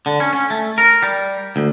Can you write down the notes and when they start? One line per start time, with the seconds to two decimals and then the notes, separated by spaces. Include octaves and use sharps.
0.06 D3
0.20 C#4
0.33 C#4
0.50 A3
0.78 A#4
1.03 G3
1.56 D2